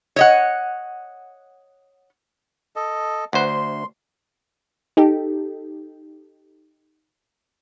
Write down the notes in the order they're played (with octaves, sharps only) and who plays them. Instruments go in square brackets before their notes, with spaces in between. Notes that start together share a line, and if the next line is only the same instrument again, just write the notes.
[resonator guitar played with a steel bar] C#5 D#5 F#5
[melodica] A4 D#5
[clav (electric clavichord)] D2 C5 [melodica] B4 F#5
[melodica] C6
[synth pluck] D#4 G4 A4